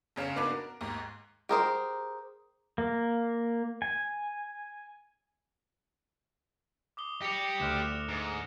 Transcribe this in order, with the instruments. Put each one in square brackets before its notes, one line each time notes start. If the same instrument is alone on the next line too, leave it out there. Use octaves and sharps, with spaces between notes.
[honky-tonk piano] G1 C#3 C#5 F5 E7
A#3 B3 D4 D#4 F#4 B4
A#4
D#2 G#2
[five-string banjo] G4 A#4 C5 [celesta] G#4 A#5 D#6
[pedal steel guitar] A#3
G#5
[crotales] D6 D#6 G7
[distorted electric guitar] G4 D5 [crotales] A#6 C#7 F7
[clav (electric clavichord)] D2 D3 [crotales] F6 F#6 E7
[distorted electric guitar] G#2